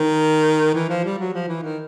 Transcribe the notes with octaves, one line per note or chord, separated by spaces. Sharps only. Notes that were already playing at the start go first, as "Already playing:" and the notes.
Already playing: D#3
E3
F3
G3
F#3
F3
E3
D#3